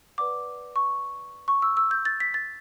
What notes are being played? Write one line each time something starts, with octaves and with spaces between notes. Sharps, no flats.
B4 D5 F#5 D6
C#6
C#6
E6
E6
G6
A6
B6
A6